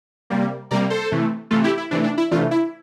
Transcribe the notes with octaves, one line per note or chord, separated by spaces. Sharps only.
C3 G3 A#3
C3 G3 A#3 A#4 D5
A4 C5
C3 E3 A3
C3 E3 A3 F4 A4
E4 G4
E4
C3 E3 A3 D4
D4
E4
C3 E3 A3 D4 F4
E4